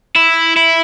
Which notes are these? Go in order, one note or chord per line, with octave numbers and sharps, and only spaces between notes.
E4
E4